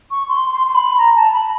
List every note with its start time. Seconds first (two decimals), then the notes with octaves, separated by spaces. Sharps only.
0.11 C#6
0.28 C6
0.52 C6
0.67 C6
0.75 B5
0.98 A#5
1.15 A5
1.33 B5